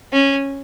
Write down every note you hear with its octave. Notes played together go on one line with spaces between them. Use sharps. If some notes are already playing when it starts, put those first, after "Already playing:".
C#4